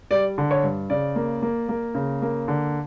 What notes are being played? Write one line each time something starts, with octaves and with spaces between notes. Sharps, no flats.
G3 D5
D3
C#5
G2
C#3 D5
A#3
A#3
A#3
C#3
A#3
D3